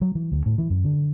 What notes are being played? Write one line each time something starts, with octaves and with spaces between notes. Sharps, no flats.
F#3
E3
D2
A2
E3
F#2
D3